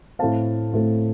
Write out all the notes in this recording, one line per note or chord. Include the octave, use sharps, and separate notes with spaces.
A2 A3 C4 F5 A5
A2 A3 C4